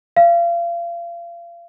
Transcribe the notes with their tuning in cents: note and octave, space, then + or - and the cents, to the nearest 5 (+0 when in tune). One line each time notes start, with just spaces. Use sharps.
F5 -35